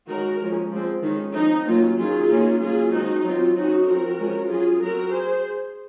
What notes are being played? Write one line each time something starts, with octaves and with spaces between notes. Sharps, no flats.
D#3 G#3 C#4 F#4 A#4
F3 G#3 C#4
F3 G#3 C4
D#3 G#3 C#4
F3 C4 D#4
D#3 F#3 A#3 C#4 F4
D#3 F#3 C#4 F4 G#4
D#3 A#3 C#4
F#3 A#3 C#4 F4 G#4
D#3 G#3 C4 D#4 F#4
F#3 C4 F4
F#3 C#4 D#4 F#4
F3 C4 F#4 A#4
F3 G#3 C#4
F#3 C#4 F4 G#4
F#3 C4 F#4 A#4
G#4 C5